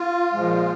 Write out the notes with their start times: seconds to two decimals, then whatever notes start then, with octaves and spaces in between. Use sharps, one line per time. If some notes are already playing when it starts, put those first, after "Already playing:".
Already playing: F4
0.33 A#2 F3 G#3